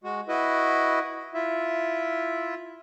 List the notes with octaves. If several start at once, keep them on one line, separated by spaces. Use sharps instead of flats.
G#3 F#4
E4 F#4 B4 D#5
E4 F4 E5